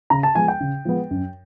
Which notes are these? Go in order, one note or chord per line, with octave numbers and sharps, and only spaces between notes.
C#3 A#5
A5
F3 G#3 B3 G#5
G5
C#3
F3 G#3 B3
F#2